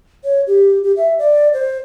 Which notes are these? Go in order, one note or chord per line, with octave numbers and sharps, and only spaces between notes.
C#5
G4
G4
E5
D5
C5